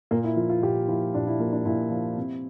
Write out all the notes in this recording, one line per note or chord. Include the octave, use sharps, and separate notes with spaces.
A#2 A#3
E4
F3 F4
F4
A#2 G4
F3 E4
A#2 D4
E4
F3 A#3
D4
A#2 E4
F3
C3